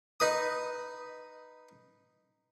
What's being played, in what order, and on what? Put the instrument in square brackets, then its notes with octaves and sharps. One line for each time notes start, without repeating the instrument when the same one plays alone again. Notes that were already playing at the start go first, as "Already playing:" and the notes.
[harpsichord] D#4 B4 D#6